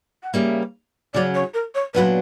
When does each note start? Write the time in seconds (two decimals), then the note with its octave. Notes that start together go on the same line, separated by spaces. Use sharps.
0.23 F#5
0.33 C#3 G3 A#3 E5
1.14 C#3 F#3 C#4 D5
1.34 C#5
1.54 A#4
1.75 C#5
1.94 A#2 F#3 B3 D4 B4